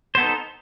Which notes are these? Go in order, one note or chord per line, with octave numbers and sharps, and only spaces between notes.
B3 D#4 A4 C5